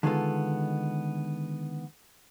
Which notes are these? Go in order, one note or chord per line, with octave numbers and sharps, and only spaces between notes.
D3 D#3 G#3 B3 F4 A4